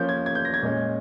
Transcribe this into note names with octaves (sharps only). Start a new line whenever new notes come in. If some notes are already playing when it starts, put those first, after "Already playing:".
Already playing: F3 A#3 C#4 G6
G#6
G#6
G6
A#6
G#6
A#2 G#3 C#4